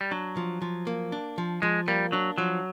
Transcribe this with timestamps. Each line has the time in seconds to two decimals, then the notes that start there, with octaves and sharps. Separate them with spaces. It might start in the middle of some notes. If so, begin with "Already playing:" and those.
0.01 G3
0.11 F#3 D4
0.37 F3
0.62 F3
0.87 A#3
1.12 D4
1.38 F3
1.62 F3 G#3
1.88 G3 A#3
2.12 F#3 D4
2.38 F3 F#3